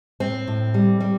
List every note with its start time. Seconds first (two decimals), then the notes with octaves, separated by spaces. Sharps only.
0.20 A2 C4
0.47 A2
0.74 G3
1.00 G3